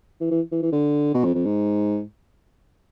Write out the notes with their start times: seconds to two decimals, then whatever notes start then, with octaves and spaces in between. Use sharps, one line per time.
0.21 E3
0.31 E3
0.52 E3
0.62 E3
0.72 D3
1.14 B2
1.24 F2
1.35 F2
1.45 G#2